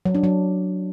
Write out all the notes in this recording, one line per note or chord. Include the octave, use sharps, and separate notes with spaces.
F#3
D4
F#3